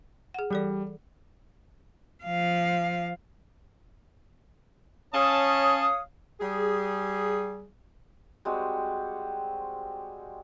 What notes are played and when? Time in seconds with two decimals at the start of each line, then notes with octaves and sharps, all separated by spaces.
0.34 G#4 F#5
0.50 E3 G3 A4 D5
2.24 F3 F5
5.14 C#4 C#5 F5 A5 D#6
6.41 G3 G#4
8.45 G3 G#3 C4 F#4